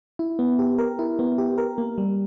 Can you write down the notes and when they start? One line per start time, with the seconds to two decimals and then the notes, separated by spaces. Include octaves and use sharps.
0.19 E4
0.39 B3
0.59 G4
0.78 A#4
0.99 E4
1.19 B3
1.38 G4
1.58 A#4
1.78 A#3
1.98 G3